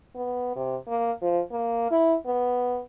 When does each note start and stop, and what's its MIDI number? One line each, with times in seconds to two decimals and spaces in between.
0.15 0.54 59
0.56 0.76 48
0.88 1.12 58
1.21 1.40 53
1.51 1.89 58
1.91 2.16 64
2.26 2.80 59